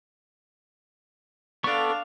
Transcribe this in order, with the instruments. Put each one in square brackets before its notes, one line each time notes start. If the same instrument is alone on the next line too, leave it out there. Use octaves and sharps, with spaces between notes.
[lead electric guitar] B3 D5 [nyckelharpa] D4 F5 [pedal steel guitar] A4 C#6